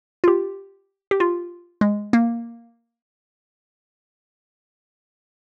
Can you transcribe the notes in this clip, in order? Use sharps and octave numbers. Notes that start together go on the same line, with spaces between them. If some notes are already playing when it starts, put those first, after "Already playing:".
F4
G4
G4
F4
G#3
A#3